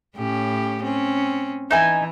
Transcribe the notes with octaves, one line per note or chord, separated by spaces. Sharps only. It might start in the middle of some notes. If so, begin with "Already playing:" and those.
A2 C#4 G4
C4 C#4
E3 D#4 E5 G#5